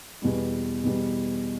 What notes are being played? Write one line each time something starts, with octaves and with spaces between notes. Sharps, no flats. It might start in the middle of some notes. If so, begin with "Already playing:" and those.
E2 B2 G3
E2 B2 G3